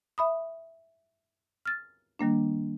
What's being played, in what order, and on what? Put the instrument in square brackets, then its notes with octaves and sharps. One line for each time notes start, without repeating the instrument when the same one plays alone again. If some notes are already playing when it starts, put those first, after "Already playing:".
[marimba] E5 B5 D#6
F6 A6
D#3 G3 A#3 D4